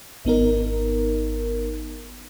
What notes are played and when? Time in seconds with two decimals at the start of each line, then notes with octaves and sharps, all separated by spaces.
0.25 G#1 B3 D#4 A#4